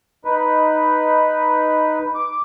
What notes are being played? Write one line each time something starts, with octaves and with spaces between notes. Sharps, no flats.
D#4 B4
D6